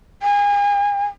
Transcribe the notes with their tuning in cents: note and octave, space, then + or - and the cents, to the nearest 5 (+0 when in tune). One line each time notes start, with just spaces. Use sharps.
G#5 -30